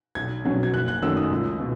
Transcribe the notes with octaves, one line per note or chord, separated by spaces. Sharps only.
B1 G#6
B2 F#3 C#4
G#6
F#1 F#6
F#6
F#2 D#3 F#3 A3 E6
D#6
C#2
B2